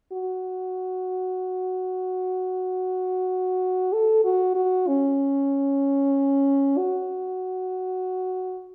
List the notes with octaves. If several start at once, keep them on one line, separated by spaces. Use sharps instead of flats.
F#4
A4
F#4
F#4
C#4
F#4